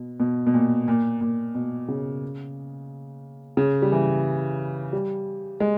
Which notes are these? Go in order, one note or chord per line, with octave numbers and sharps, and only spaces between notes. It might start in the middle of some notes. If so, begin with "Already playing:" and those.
Already playing: B2
B2
B2
A#2
A#2
A#2
B2
C#3
C#3
G3
E3
G3
G#3